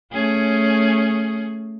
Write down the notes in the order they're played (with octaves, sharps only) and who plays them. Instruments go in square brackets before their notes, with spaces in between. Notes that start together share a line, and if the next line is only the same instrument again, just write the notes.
[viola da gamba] A3 C#4 G#4